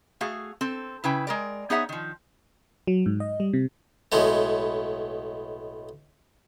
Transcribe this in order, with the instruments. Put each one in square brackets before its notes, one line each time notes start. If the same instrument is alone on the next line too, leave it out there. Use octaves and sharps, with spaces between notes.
[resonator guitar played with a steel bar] A3 F#4 G#4 F5
C4 A4
C#3 E4 B4 G5
G#3 A#4 D5
B3 D#4 G#4 C#5 E5 F#5
D#3 F3
[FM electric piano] F#3
G#2
D#5
G3
C3
[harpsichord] B1 A2 G#3 B3